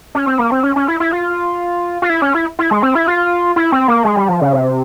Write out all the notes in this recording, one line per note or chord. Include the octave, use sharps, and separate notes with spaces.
C#4
C4
A#3
C4
C#4
C#4
E4
E4
F4
F4
E4
C#4
E4
E4
G#3
C4
E4
F4
E4
C4
A#3
G#3
G3
F3
C#3
C3